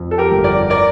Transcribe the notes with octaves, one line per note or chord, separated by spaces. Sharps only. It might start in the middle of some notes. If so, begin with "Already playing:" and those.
Already playing: F2
A4
G4 A#4
G1
A#4 D5
A#4 D5